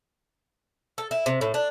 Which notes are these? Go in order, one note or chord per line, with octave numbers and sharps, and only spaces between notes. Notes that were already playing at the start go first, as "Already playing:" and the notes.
A4
E4
C3
A2
D4